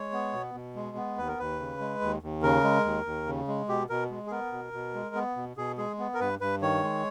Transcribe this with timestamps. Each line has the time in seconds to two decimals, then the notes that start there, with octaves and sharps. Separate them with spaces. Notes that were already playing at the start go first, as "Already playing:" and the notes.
Already playing: G#3 C#5
0.13 B3
0.33 B2
0.54 B2
0.75 G#3
0.97 B3
1.17 D#2 B4
1.28 A#4
1.38 D#2 B4
1.60 C#3
1.80 G#3
2.01 D#2
2.22 D#2
2.43 C#3 A#4
2.64 G#3
2.84 D#2
3.05 D#2
3.26 C#3
3.48 G#3
3.68 B2 G4
3.89 B2 A#4
4.10 G#3
4.27 G#4
4.31 B3 A#4
4.52 B2
4.73 B2
4.94 G#3
5.15 B3
5.36 B2
5.57 B2 G#4
5.78 G#3 G#4
5.99 B3
6.14 A#4
6.20 G2 B4
6.41 G2 B4
6.61 D#3 C#5
6.83 G#3